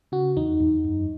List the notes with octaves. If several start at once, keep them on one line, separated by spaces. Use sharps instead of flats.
C#3 F#4
E2 D#4
E2
F#2